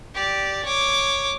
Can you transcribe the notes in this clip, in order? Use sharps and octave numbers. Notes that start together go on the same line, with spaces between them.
G4 D5
C#5 D6